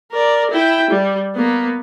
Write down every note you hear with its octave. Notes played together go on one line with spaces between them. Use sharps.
A#4 D5
E4 G5
G3
A#3 B3